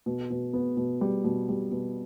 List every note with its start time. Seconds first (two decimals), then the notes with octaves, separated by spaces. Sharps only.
0.06 B2
0.31 B2
0.53 B3
0.77 B2
1.01 G3
1.24 B2
1.49 G3
1.72 B2